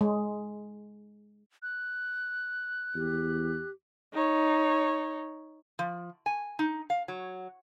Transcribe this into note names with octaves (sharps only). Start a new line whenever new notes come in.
G#3
F#6
E2 G4
D#4 C#5
F3
G#5
D#4
F5
F#3